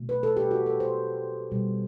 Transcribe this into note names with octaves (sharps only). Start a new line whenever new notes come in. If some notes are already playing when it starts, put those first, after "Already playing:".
Already playing: B2 F#3 A3
B4
A4
G4
F#4
A4
C5
B2 G3